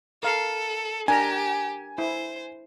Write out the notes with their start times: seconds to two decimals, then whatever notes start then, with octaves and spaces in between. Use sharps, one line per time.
0.23 A4 A#4 F5
1.08 D4 G4 A#4 G#5 A#5
1.98 E4 C5